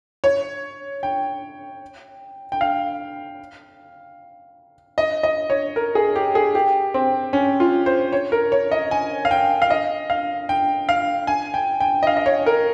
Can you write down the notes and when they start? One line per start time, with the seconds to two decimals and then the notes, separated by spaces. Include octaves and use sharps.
0.24 C#5
1.03 G5
2.52 G5
2.61 F5
4.98 D#5
5.23 D#5
5.50 C#5
5.76 A#4
5.95 G#4
6.16 G4
6.35 G#4
6.55 G4
6.94 C4
7.33 C#4
7.60 F4
7.86 C5
8.13 C#5
8.32 A#4
8.52 C#5
8.71 D#5
8.91 G#5
9.25 F5
9.31 G5
9.62 F5
9.70 D#5
10.10 F5
10.49 G5
10.89 F5
11.27 G#5
11.54 G5
11.80 G5
12.03 D#5
12.07 F5
12.17 D#5
12.26 C#5
12.46 A#4